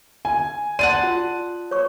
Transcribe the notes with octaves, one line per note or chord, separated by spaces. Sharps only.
G#5
D5 F#5 A5 C6 D#7
F4
C#5 C#6